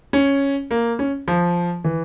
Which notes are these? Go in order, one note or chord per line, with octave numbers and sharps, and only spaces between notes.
C#4
A#3
C#4
F3
E3